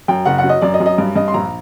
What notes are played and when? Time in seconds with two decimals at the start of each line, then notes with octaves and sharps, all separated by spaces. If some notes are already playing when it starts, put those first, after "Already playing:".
0.08 F#2 G5
0.25 F#1 F#5
0.38 F#5
0.44 F#3
0.49 D#5
0.61 F#2 D5
0.74 D#5
0.80 F#2
0.86 D#5
0.98 G2
1.15 G2 D#5
1.28 C6
1.34 A#1 A#5